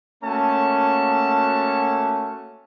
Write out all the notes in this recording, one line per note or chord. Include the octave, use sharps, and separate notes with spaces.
A3 A#3 C#4 F#4 A5